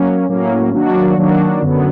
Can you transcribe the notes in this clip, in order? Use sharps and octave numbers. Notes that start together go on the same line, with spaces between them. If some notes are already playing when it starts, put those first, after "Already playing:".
Already playing: F#3 A#3 C#4
A2 F#3 A#3 C#4
D#3 F#3 A#3 D4 F#4
D#3 F#3 A#3 D4 F#4
F#2 D3 F#3 B3